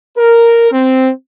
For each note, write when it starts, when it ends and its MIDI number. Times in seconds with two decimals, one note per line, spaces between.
0.17 0.71 70
0.72 1.10 60